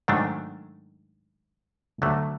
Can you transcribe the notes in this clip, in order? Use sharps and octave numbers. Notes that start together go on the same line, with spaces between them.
G#2 D#3 F#3 A3 D4
D2 D3 F#3 A3